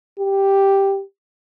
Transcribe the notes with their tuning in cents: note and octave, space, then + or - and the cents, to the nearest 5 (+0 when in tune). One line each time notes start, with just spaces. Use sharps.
G4 +0